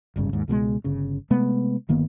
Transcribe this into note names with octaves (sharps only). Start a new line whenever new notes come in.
D1 G1 G2 C#3
D#2 G#2
C#2 B2 G3 G#3
G1 C#3
C3 G#3 A3 B3
G1 D#3 A#3 B3